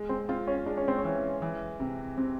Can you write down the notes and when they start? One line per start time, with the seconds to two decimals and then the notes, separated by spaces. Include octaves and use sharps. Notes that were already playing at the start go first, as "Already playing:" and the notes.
Already playing: G#3
0.09 C4
0.29 C4 F4
0.47 C#4
0.66 G#3 D4
0.77 C#4
0.88 C4
0.98 C#4
1.04 E3
1.42 E3
1.80 C3
2.17 C3 C4